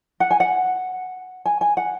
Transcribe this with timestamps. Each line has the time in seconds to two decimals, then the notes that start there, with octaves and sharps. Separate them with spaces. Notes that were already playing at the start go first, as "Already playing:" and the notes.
0.20 F#5
0.31 G#5
0.40 F#5
1.45 G#5
1.61 G#5
1.77 F#5